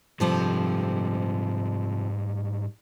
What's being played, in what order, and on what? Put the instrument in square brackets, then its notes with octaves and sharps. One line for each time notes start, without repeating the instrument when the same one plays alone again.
[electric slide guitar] G#2 G3 [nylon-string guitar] C3 F3 A4